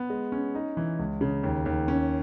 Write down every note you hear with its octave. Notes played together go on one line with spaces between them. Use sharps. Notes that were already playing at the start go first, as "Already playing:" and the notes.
Already playing: B3
G#3
C#4
D#4
E3
C#2
C#3
D#2
D#2
C#4